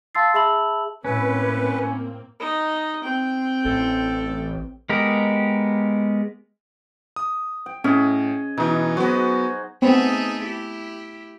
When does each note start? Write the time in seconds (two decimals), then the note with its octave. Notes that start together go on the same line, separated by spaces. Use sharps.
0.15 F5 A5 C6 E6 A6 C7
0.34 G#4 E5 A5 B5 E6 F#7
1.05 A2 A#3 C4 C#4 B4
2.40 D#4 D#5
3.04 C4 G5
3.65 A1 A4
4.89 G#3 B3 G4 A#4 D#5
7.16 D#6
7.66 G5
7.84 A2 C#4 G#4 D#5
8.57 B2 E3 D#4
8.97 F#3 B3 F#4 G#4 C5
9.82 A3 B3 C4 D#4 G#4
10.43 E4 G4